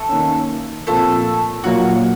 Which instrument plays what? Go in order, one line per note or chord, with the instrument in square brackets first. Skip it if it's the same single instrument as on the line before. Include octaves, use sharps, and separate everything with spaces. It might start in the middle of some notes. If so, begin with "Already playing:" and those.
Already playing: [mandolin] A3 A4
[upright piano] D#3 A#3 C#4
[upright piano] A#2 F3 C4 F4 A#4 [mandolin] A3 A4
[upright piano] A#2 F#3 A#3 F4 [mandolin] F#4